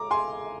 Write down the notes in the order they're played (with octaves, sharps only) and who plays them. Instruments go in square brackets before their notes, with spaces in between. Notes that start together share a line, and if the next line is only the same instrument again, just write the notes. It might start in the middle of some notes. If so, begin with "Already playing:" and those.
Already playing: [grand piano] A#5 D6
G#5 C6